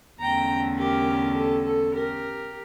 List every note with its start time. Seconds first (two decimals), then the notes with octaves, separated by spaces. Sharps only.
0.20 E2 D3 A3 C#4 G5 A#5
0.78 G4 A#4
1.37 A4
1.66 A4
1.95 G4 A#4